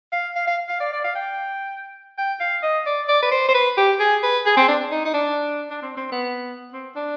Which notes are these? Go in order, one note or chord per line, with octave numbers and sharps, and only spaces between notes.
F5
F5
F5
F5
D5
D5
F5
G5
G5
F5
D#5
D5
D5
B4
C5
C5
B4
G4
G#4
B4
G#4
C4
D4
D#4
D#4
D4
D4
C4
C4
B3
C4
D4